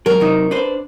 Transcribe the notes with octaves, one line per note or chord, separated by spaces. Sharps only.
F#3 A#4
C3 F#3 D#4
D4 B4 C5